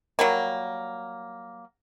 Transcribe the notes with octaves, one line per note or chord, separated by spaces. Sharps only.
F#3 G3 A#3